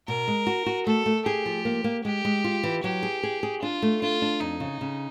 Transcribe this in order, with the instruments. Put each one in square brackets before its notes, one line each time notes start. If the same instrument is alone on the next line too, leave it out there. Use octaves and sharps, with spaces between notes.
[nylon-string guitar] B2 [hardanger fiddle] A#4
[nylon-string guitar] G#3
F#4
F#4
[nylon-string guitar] A3 [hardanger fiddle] A4
[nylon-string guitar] A3
[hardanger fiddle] G4 [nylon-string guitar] G#4
[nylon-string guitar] F3
A#3
A#3
[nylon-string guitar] G#3 [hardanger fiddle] G4
[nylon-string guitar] G#3
F4
E3
[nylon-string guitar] F#3 [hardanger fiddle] G4
[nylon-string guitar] G#4
G#4
G#4
[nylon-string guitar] D4 [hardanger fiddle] F4
[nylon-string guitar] A3
[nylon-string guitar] D4 [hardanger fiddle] F4
[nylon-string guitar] D4
[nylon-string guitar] F2 [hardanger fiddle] D#4
[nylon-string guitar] C#3
C#3